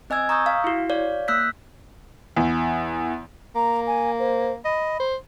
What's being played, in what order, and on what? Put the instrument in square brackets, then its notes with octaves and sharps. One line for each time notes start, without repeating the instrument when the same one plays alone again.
[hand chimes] C4 D#5 G#5 E6 G#6
A#5 C#6 D#6 E6 G6
F5
E4 F#4
C#5 D5 F5
A#3 E6 F#6 G6 B6
[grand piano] E2
[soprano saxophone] A#3 [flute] A#5
[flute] G#5
C5
[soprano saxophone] D#5 [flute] B5
[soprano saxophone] C5